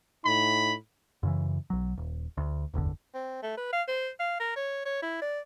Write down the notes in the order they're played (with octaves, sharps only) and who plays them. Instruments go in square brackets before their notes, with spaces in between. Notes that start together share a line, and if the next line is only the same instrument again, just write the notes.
[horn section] A2 D#4 B5
[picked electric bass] F#2 C#3 E3
B1 F#3
D#1
D2
D1 G1 E2 D3
[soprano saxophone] C4
A3
B4
F5
C5
F5
A#4
C#5
C#5
E4
D5